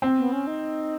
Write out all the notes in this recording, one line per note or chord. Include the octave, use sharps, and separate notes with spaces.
C4
B3
C#4
D#4